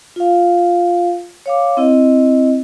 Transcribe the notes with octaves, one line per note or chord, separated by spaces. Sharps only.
F4 F5
C#5 F5 D6
C4 E4 D#5